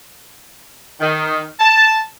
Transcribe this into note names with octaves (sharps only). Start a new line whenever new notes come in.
D#3
A5